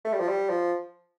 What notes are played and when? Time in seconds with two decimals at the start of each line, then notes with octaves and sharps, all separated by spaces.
0.05 A3
0.13 G3
0.20 F3
0.28 G3
0.49 F3